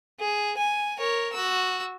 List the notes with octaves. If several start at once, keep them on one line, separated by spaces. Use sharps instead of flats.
G#4
G#5
A#4 C#5
F#4 E6